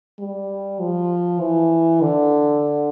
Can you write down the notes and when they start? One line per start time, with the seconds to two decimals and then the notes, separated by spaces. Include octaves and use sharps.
0.19 G3
0.80 F3
1.40 E3
2.01 D3